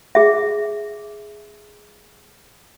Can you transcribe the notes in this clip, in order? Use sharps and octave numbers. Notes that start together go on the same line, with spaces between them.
G#4 E5